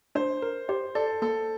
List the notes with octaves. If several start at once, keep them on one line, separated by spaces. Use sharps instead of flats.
D4 C5
A#4
G4 C5
A4 D5
A#3 A4